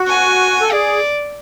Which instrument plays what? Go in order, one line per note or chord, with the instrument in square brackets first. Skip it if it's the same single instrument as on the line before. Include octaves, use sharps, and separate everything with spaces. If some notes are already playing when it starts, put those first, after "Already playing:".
Already playing: [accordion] F#4
[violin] G#5
[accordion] A4
[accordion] G#4 [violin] D5